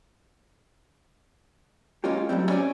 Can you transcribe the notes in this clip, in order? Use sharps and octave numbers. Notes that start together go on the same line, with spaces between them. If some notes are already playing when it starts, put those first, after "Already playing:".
G#3 A#3 C#4 F4 G4
A2 F#3 G3 C4
C#4 C#5 D5 G#5